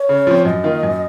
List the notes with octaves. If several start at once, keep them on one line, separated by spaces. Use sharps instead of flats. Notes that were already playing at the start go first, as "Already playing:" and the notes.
Already playing: C#5
C#3
F3 C4
F#2 D#5
D#3 A#3 F4
F#2